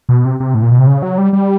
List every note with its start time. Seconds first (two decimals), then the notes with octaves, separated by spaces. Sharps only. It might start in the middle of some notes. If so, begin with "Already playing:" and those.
0.09 B2
0.25 C3
0.40 C3
0.54 A2
0.62 A#2
0.71 B2
0.78 C3
0.87 C#3
1.02 F#3
1.18 G3
1.33 G3